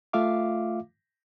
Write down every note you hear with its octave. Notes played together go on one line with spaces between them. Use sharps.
A3 F4 E5 F5 D6